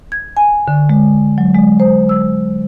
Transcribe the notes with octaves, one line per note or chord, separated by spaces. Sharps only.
G#6
G#5
D3
G#3
F#3
G#3
C5
E6